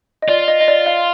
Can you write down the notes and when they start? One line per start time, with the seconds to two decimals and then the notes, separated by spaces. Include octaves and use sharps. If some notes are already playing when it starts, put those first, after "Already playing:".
0.22 D#5
0.28 F4 D5
0.48 D#5
0.61 D#5
0.68 D5
0.86 F5